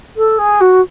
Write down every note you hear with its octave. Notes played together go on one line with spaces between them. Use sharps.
A4
G#4
F#4